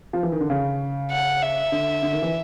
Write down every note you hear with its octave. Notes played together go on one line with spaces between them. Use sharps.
F3
E3
D#3
D3
C#3
F#5
E5
D3
D3
D#3
E3